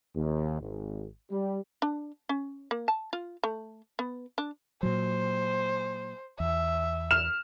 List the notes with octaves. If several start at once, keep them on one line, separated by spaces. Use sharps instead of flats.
D#2
G#1
G3
D4
C#4
A#3
A5
F4
A3
B3
D4
A#2 F#3 C5
E2 E5
F6 E7